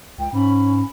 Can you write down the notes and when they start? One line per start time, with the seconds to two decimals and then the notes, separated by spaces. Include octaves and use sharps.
0.18 C#2 G5
0.33 G#2 C#4 B5